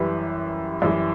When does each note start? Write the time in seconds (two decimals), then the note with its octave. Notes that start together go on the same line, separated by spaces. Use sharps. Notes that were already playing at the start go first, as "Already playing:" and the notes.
Already playing: F#2 E3 G3 G4 B4
0.82 F#2 E3 G3